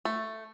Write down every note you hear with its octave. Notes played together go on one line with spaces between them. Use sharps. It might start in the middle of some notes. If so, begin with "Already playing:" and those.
A3